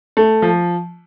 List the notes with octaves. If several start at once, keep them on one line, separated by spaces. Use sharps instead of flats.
A3
F3